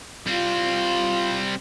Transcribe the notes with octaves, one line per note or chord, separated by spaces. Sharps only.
G3 C4 F4